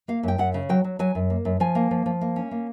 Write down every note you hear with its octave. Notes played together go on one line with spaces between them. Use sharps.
A#3 F5
F#2 G5
F#2 F#5
C#3
F#3 G5
F#3
F#3 G#5
F#2
A#3
F#2
F3 G#5
A#3
F3
F3
A#3
C#4
A#3